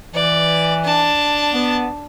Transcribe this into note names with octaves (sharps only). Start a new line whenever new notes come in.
E3 D5
D4 A5
B3